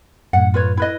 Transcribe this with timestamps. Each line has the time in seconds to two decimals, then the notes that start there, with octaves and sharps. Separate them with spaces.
0.33 F#2 A2 F#5
0.54 F4 B4 C#5
0.77 E4 B4 D#5